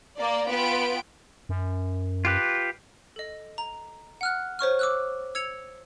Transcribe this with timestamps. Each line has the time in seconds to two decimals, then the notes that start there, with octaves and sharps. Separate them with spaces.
0.18 A#3 D5
0.50 B3 F4 B4 G5 D7
1.49 F#2
2.25 F4 G4 B4
3.16 A4 D#5
3.58 A#5
4.21 F#5 F6 F#6
4.59 C5 C#5 C#6 F6
4.79 D6 E6 F#6
5.35 E6 G#6 C#7 F7